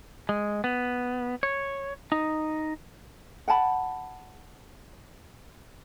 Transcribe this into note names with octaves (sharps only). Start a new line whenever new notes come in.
G#3
B3
C#5
D#4
F#5 G5 A5 B5